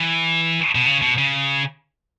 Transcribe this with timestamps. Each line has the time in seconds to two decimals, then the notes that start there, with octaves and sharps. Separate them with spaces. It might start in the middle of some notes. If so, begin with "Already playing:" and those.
Already playing: E3
0.75 B2
0.86 C#3
1.02 B2
1.18 C#3